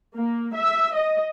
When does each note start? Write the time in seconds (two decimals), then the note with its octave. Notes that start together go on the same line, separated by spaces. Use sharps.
0.15 A#3
0.54 E5
0.94 D#5